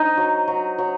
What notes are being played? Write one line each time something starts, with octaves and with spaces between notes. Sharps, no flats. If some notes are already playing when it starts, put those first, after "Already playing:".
Already playing: D#4
F#3
F#3
F#3